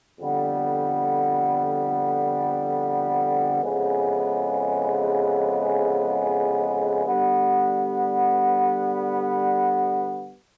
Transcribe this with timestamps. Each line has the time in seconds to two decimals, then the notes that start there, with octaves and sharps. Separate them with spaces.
0.19 F2 D3 G3 B3
3.62 F2 C#3 E3 G#3 B3
7.05 D3 G3 B3